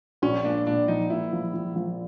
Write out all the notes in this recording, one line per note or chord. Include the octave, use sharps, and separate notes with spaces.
A#1 C#4
A#2 D4
A#2 D4
F3 D#4
A#2 E4
F3
F3
F3